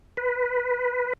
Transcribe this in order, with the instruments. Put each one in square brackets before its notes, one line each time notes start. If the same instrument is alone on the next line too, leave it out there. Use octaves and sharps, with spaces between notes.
[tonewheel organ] B4